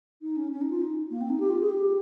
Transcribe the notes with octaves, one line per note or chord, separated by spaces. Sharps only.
D#4
C#4
C#4
D#4
F4
D#4
A#3
C4
D#4
G4
F4
G#4
G4